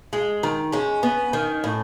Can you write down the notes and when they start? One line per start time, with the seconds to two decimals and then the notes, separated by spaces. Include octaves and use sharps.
0.13 G#3
0.43 D#3
0.72 G#3 C#4
1.03 B3
1.33 D#3
1.64 A2